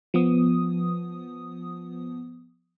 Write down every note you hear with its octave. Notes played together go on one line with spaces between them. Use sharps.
F3 B3 D#6